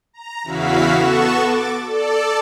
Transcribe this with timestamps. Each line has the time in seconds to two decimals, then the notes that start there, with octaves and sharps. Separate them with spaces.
0.13 A#5
0.44 E2 C#3 E4 F#4 F5 B6
0.95 B3 F#4 A4 C#6 E7
1.44 D6 A6
1.83 A4 D5